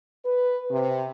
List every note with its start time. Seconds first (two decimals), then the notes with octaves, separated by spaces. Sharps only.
0.24 B4
0.71 C3